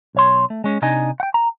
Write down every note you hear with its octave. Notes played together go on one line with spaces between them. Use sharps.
B1 C#5 C6
A3
G#3 C#4
C3 D4 D#4 D#5 G#5
F#5 G5
A#5